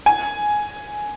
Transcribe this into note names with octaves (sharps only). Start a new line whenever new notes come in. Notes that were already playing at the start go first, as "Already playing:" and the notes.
G#5